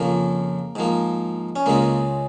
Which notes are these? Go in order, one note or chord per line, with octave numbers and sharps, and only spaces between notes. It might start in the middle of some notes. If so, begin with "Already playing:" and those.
Already playing: F2 C#3 F3 A#3
G#2 F3 A#3
C#4
C#2 C#3 G#3 A#3